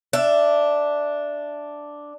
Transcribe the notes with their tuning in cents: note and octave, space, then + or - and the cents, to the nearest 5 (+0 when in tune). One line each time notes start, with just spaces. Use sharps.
D4 +0 E5 +20